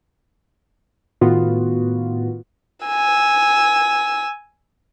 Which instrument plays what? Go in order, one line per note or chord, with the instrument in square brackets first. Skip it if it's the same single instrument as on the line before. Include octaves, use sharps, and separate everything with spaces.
[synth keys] A2 D#3 B3 F4 F#4
[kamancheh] G#5 E6